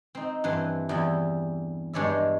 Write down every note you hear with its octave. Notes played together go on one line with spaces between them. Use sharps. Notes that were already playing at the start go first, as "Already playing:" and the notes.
C4 D#4
G2 E3 C4 C6
E2 G3 E4
G2 G#3 C#5 D5 E5